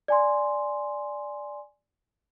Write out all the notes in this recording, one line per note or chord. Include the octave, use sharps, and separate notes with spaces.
D5 G#5 C6